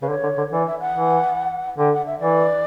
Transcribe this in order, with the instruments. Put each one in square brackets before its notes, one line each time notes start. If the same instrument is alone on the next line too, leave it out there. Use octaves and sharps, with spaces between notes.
[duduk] C#3 [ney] B4
[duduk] D3 [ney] C#5
[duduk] D3
D3
[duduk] E3 [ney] D5
[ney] E5
F#5
[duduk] E3
[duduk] D3 [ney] G5
[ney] F#5
E5
[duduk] E3 [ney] D5